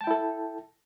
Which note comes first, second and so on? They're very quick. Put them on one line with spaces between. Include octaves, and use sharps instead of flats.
A5 G5 E4 A4